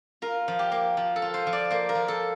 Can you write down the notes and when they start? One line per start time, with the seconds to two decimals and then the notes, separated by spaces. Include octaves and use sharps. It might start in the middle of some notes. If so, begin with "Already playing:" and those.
0.22 F4 A#4
0.48 F3
0.59 G4
0.72 A#3
0.97 F3
1.16 A4
1.22 F4
1.34 C5
1.47 F3
1.53 D5
1.70 A#3 C5
1.89 A#4
1.95 F3
2.08 A4